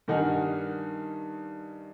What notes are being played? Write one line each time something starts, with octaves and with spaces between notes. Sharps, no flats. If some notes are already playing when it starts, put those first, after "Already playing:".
G2 D#3 D#4 F#5 G#5 F6